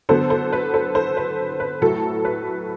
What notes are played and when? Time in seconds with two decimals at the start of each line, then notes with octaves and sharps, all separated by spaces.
0.09 D3 F#3 B3 A4 C5
0.30 A4 C5
0.53 B4
0.74 A4 C5
0.95 A4 C5
1.17 B4
1.60 B4
1.81 A2 F#3 A3 A4
2.25 B4